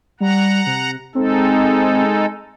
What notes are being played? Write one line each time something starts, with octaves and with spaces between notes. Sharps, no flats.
G3 F#5 A#5
C3
G#3 C4 D#4 A4